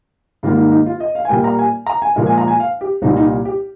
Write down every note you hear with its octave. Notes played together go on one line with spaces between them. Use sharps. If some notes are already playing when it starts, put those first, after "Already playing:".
G#2 D#3 G3 A#3 F4
D#4
D#4
F4
D#5
F5
G#5
A#2 G3 A#3 G5
A#5
G#5
A#5
G#5
A#2 F3 G#3 A#4
G#5
A#5
G#5
F5
G4
C2 A#2 G3 D#4
D#4
G4